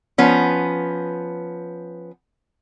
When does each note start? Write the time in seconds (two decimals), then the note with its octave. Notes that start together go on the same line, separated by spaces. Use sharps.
0.18 F3 B3 C#4